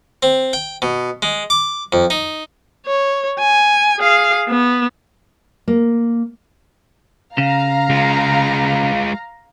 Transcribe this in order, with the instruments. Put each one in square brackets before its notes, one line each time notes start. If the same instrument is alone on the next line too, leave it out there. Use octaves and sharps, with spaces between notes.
[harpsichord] C4
G5
B2
G#3
D6
F2
D#4
[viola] C#5
G#5
G#4 F5
B3
[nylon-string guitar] A#3
[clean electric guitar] C#3 [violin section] F5 A#5
[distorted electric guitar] G#3 F4